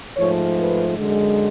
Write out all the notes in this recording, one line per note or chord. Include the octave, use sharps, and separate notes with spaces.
G#2 F3 A3 C#5
B4
F#2 D3 G#3